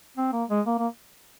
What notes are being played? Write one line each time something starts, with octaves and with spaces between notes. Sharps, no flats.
C4
A#3
G#3
A#3
A#3